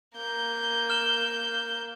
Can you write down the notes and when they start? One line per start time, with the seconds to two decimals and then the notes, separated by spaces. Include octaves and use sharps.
0.16 A#3 G6
0.90 F6 E7 G7